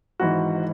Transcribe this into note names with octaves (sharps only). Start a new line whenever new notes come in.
G#1 G#2 E3 F#4